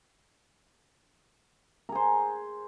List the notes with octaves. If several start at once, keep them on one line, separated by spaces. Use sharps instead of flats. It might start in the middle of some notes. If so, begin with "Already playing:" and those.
G#4 A#4 C5